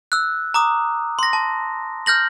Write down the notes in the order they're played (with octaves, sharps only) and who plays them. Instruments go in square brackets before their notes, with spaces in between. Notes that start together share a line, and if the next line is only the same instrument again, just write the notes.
[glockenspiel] E6 F#6
A#5 D6 D#6
C6 A#6
A5
F6 G6 A#6 F#7